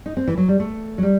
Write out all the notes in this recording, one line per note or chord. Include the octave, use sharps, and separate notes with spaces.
D#4
C4
E3
F#3
G3
A3
F#3
G3